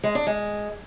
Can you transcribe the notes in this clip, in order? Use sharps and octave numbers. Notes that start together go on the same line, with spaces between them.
G#3
D4
G#3